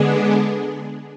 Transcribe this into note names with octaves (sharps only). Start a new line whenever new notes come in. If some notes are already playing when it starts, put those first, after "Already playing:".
Already playing: D3 G#3 B3 D4 G#4